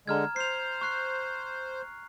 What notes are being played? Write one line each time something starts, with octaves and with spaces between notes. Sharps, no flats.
D3 G#3 A#5 F6 G#6
C5 C7 F7
C#6 F#6 C7